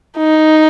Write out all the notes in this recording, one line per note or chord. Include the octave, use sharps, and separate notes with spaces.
D#4